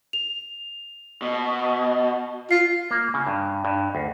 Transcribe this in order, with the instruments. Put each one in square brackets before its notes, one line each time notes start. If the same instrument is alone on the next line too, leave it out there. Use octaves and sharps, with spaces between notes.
[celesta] F7
[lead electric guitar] B2
[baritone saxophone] F4 [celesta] C7
[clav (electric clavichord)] A#3
C#3
G2
G2
D2